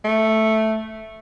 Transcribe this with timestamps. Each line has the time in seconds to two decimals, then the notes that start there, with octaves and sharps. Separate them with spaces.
0.04 A3